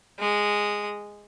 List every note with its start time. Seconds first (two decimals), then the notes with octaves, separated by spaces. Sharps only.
0.19 G#3 D#6